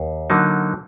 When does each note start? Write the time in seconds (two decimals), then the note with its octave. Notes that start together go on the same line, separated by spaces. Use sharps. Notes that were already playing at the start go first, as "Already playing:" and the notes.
Already playing: D#2
0.30 D3 F#3 A#3 D#4